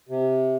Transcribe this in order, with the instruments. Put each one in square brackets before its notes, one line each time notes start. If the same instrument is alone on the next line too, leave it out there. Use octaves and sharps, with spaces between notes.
[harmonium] C3